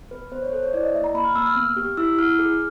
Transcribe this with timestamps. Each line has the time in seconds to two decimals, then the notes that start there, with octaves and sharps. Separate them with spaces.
0.11 B3 B4
0.32 B3 C5
0.43 C#5
0.52 A4 C5
0.63 C#5
0.73 E4 D5
0.83 D#5
0.94 A#3 E5
1.04 A#5
1.15 A#3 B5
1.25 F6
1.35 A#3 E6
1.46 F6
1.56 B3
1.76 G4
1.97 E4 E6
2.18 E4 F6
2.39 G#4